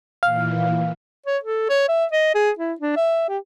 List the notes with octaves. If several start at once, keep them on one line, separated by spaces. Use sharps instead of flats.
A#2 E3 F5
C#5
A4
C#5
E5
D#5
G#4
E4
D4
E5
G4